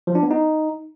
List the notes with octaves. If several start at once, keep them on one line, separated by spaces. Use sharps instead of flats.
F3
D4
B3
D#4